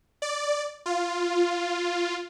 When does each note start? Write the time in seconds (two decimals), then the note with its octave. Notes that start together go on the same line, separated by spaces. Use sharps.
0.22 D5
0.86 F4